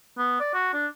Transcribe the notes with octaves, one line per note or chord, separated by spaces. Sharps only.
B3
D5
F#4
D4